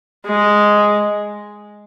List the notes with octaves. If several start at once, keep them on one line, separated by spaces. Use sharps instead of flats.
G#3